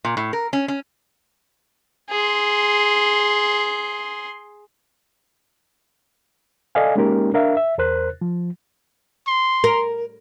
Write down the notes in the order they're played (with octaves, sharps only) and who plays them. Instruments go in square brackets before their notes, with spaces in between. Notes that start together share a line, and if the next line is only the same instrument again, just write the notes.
[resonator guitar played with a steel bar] A#2
A2
A#4
C#4
C#4
[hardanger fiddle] G#4 C6
[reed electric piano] A4 D5 D#5 F5 G#5
G#3 A#3 C#4 D#4 G4 A#4
D4 A#4 E5 F5
E5
E2 A#4 C5 F#6
F3
[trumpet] C6
[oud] A#4